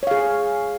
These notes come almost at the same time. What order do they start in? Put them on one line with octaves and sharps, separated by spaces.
C#5 F5 G#4